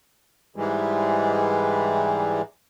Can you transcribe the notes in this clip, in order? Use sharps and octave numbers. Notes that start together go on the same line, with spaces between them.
G#2 E3 G3 G#3